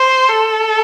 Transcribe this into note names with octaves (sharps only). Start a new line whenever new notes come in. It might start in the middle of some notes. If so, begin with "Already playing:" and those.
Already playing: C5
A4